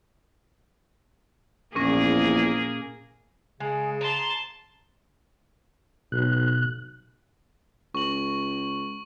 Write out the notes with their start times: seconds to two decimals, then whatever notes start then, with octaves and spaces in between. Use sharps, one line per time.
1.75 A#1 E2 A#2 A#3 C#4 G#4 A#6
3.60 C#3 G#3 G#4
4.01 A5 A#5 C6
6.12 B1 B2 F#6
7.95 C#2 C#6 F#7